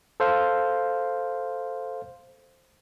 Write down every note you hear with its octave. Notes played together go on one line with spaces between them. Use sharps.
A4 C5 F5